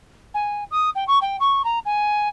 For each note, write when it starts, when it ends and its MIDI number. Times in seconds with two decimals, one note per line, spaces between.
0.34 0.64 80
0.71 0.90 87
0.95 1.04 79
1.07 1.18 85
1.21 1.36 79
1.40 1.62 85
1.64 1.79 82
1.85 2.28 80